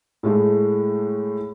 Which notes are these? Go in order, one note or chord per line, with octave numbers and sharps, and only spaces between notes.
A2 G#3 A3